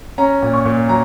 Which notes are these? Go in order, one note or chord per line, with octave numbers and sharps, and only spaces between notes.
C#4 A#5
A#2
C#6
A#2
F#3 A#5